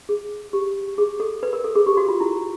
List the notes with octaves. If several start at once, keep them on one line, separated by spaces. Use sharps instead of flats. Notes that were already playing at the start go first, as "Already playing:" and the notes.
G#4
G4
G#4
A4
B4
A#4
A4
G#4
G4
F#4
F4
E4